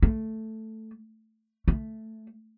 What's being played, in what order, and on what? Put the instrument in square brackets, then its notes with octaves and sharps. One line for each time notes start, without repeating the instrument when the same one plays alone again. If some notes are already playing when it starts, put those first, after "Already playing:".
[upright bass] A3
A3